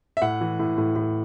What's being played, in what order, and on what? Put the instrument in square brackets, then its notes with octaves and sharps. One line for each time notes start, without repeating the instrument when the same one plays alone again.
[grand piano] E5
A2 F#5
E3
A2
A2
A2